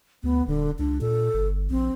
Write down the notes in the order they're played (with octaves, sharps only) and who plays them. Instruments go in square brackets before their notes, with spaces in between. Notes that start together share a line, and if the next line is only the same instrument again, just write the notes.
[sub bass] D2 [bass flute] B3
[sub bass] D#1 [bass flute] D3
[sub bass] C#2 [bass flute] D4
[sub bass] A#2 [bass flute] A4
[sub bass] G1
[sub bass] A#1 [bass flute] C4